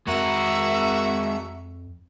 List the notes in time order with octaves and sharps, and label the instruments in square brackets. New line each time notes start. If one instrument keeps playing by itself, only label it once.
[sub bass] F2 [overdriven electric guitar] G#3 A#4 [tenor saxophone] F#4 [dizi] E5